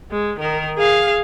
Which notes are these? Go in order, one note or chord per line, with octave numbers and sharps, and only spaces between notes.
G#3
D#3 A#4
G#4 F5